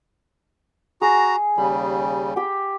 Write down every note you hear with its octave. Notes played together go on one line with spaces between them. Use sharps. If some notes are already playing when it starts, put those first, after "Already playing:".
F#4 G#4 A#5
D#2 C#3 G3 B5
G4 G5